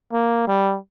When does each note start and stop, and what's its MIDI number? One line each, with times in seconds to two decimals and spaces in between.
0.13 0.46 58
0.48 0.77 55